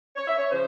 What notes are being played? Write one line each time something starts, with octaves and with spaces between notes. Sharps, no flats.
C#5
E5
C#5
C#3 F3 C5